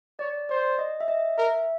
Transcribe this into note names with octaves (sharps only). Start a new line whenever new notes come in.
C#5 D5
C5 D5
D#5
E5
D#5
A#4 E5